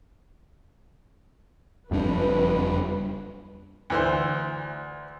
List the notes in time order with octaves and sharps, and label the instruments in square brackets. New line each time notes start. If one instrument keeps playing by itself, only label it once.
[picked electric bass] F#1 G3 D4 [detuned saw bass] F2 [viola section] B4
[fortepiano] D2 E3 C5